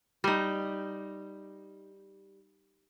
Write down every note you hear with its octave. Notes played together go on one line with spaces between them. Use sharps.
G3 D#4